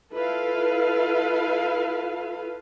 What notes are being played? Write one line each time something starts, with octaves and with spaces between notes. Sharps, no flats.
E4 F4 A4 B4 F5